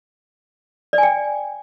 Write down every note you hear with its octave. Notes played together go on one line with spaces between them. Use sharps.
D5
G#5
G5